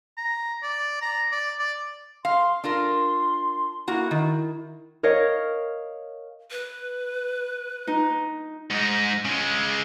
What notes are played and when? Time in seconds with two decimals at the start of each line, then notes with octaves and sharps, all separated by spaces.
0.18 A#5
0.63 D5
1.02 A#5
1.32 D5
1.59 D5
2.25 F5 C6
2.64 D4 F4 A#4 C6
3.88 A#3 E4 F#4
4.11 D#3
5.03 A#4 C#5 D#5 F5
6.51 B4
7.87 D#4
8.71 G#2 D#4
9.25 C#3 G#3